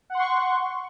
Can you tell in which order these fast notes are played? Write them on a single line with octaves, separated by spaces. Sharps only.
F#5 C6 C#6